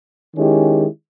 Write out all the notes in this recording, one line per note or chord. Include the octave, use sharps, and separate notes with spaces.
D#3 G#3 C#4 E4 G4